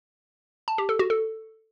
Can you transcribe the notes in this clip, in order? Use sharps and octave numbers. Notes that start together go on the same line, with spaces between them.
A5
G4
A4
F#4
A4